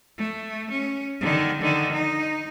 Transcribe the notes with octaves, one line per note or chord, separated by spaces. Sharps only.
A3
C#4
D3 D#3
D3 D#3
D#4